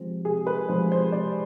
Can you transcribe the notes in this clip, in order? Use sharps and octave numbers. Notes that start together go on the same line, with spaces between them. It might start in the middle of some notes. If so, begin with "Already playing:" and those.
Already playing: C3 F3 G#3 C4
C3 G#4
B4
F3 G#3 C4 C5
C5
C3 D5